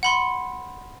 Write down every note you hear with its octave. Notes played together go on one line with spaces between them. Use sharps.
F#5 B5 C6